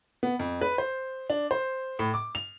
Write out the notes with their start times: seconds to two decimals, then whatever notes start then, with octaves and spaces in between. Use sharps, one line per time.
0.23 B3
0.39 F2
0.61 B4
0.78 C5
1.30 D4
1.51 C5
1.99 A2
2.14 D6
2.35 F7